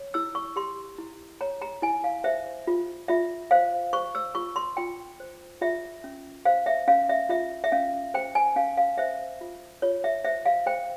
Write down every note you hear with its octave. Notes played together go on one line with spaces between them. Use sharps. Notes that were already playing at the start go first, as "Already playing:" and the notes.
Already playing: C#5
E4 E6
C#6
G4 C6
E4
C#5 A#5
A#5
E4 G#5
F5
C5 E5
F4
F4 E5
C5 F5
C5 C#6
E6
F4 C#6
C6
F4 G5
C5
F4 E5
C#4
C5 F5
E5
C#4 F5
E5
F4 E5
E5
C#4 F5
C5 G5
G#5
C#4 F5
F5
C5 E5
F4
F4 C#5
E5
C5 E5
F5
C5 G5